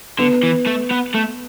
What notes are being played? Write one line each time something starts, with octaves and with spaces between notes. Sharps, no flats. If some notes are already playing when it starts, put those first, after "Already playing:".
D3 B3
E3
A3
B3
A3